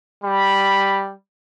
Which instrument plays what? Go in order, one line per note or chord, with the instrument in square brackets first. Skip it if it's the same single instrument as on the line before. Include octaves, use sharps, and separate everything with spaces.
[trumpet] G3 [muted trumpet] B5